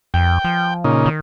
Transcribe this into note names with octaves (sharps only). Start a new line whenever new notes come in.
F2 G5
F3
A#2 C#3 D#4
D#3